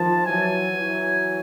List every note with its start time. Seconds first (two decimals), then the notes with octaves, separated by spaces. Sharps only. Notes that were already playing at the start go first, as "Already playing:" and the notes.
Already playing: D#3 F3 A5
0.26 E3 F#3 G#5
0.74 E3 F#3